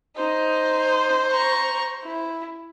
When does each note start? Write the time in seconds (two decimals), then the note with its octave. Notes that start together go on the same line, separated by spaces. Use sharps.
0.17 D#4 C5
1.31 A#5 C#6
2.03 E4